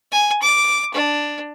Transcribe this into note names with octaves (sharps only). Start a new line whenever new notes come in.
G#5
D6
D4